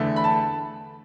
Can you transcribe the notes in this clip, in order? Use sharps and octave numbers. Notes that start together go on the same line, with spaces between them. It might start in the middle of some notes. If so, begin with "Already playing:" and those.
Already playing: E2 D3 A3
B5
A5